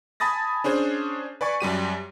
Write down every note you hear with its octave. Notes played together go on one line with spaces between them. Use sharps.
G#5 A5 B5 D#6 A6 A#6
C#4 D4 G#4 C5
B4 D5 G#5 C#6
F#2 G3 G4 D#7